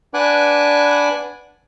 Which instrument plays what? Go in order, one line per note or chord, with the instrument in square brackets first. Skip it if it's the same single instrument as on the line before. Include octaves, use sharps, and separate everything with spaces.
[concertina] D4 B4 F#5 G#5 D6 F#6